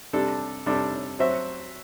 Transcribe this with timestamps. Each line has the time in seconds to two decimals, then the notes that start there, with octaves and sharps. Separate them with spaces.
0.13 C3 G3 D4 A4
0.66 C3 G3 D4 A4
1.19 F#3 C4 F#4 C5 E5